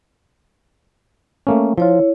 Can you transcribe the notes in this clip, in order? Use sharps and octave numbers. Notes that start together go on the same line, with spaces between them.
A3 A#3 C#4
F3 E4 F4 C#5